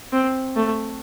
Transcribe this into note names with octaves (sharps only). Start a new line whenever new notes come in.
C4
A3